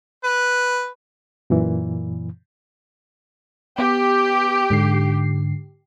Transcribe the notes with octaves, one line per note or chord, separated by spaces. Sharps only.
B4
F#2 A#2 E3
B3 G4
G#2 D3 C7